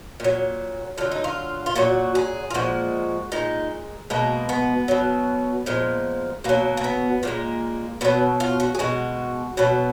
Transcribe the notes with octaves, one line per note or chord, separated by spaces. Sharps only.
A#2 F#3
D3 F#3 F4
D#4
F4
F4
A#2 F#3 F#4
G#4
F4
A#2 F3 G#3 F#4
A#2 G#3 D#4
B2 G#3 A#3
B3
B2 F#3
A#2 F3 G#3
B2 F#3 A#3
A#3
B3
A#2 F3 G#3 A#3
B2 F#3 B3
F4
F#4
G#4
B2 G#3 F#4
B2 F#3 B3